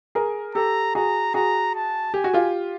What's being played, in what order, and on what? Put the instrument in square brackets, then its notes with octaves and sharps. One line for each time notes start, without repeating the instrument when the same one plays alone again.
[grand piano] G#4 A#4
[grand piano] G4 A4 [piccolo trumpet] A#5
[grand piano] F#4 G#4 [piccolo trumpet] A#5
[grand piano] F#4 G#4 [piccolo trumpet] A#5
[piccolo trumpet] A5
[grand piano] G4 [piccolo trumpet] G#5
[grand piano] F#4
F4 G4